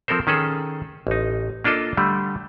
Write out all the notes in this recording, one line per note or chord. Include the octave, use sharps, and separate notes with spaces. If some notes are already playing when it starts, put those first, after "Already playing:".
F3 C4 A4 A#4 C5
D#3 C#4 G#4 A4
A1 D#4
A#3 D4 F4 A4 D#5
D3 G3 A3